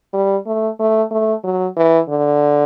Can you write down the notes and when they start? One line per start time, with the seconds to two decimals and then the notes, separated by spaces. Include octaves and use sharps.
0.14 G3
0.46 A3
0.80 A3
1.11 A3
1.44 F#3
1.77 E3
2.09 D3